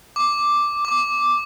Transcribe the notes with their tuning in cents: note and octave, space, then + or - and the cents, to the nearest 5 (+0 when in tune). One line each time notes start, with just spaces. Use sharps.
D6 +0
D6 -5